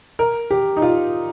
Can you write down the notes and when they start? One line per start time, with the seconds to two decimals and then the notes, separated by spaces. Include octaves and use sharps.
0.19 A#4
0.51 G4
0.77 D#4
0.82 F4